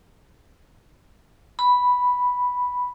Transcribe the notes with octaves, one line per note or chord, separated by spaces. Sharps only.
B5